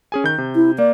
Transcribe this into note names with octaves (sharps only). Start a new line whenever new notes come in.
C#4 G#4 G#5
D#3 G6
C3
E4
A#3 D5